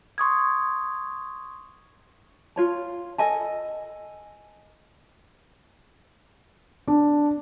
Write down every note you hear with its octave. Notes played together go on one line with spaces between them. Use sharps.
C6 C#6 D#6 G#6
F4 C#5 A5
A4 D#5 G#5 A5
D4